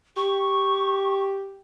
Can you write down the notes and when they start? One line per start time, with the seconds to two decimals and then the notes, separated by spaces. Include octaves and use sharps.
0.16 G4 C#6